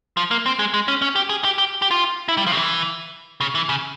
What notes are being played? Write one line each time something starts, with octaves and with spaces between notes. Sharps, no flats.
F3
A#3
C4
G#3
G#3
C#4
C#4
G4
G#4
G4
G4
G4
F4
E4
G3
F3
C#3
E3
C#3
E3
C#3